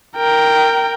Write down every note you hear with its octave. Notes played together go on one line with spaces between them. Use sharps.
A#4 G5